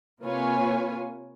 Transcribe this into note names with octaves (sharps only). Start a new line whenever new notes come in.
C3 A#3 F4 B4 C#5 G#5